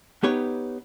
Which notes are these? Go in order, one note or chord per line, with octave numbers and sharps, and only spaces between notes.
B3 D#4 G4 B4 C#5